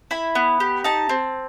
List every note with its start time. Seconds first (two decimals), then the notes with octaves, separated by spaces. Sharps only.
0.11 E4 B5
0.35 B3
0.60 G4
0.84 D#4 A5
1.09 C4